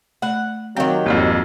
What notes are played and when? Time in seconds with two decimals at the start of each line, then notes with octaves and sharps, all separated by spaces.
0.22 A3 F#5 B5
0.77 D#3 F#3 C4 G4 F5
1.06 G#1 F2 A#3 F#4 D5